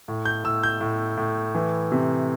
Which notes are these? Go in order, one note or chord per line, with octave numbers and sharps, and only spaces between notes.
A2
G6
A2 E6
G6
A2
A2
E3
C3